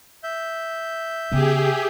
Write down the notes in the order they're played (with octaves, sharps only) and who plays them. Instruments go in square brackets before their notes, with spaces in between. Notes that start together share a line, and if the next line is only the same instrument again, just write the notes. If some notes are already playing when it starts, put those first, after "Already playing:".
[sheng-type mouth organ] E5 G6
[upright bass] C#3 B3 [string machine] G4 G#4